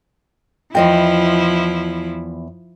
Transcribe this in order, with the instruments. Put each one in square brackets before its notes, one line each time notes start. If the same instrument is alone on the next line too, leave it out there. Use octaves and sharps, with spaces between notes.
[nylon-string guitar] E2 D#5 G5 [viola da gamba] F3 E4